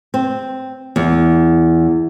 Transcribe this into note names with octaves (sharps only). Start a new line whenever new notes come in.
C4
E2